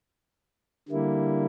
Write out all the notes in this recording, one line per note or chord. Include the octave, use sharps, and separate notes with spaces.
D3 G3 A#3 E4